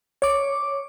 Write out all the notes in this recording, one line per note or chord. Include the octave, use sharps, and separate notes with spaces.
C#5 D6